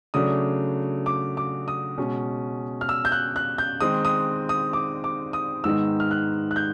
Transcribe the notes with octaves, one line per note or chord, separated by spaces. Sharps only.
C#3 F#3 A3 D4 D#6
D6
D6
D#6
B2 G#3 C#4
F6
E6
G6
F#6
F#6
G6
D#3 G#3 C4 D#4 D#6
D#6
D#6
D6
D6
D#6
G#2 D#3 G#3 B3 D#4 E6
F6
F#6
F#6
G6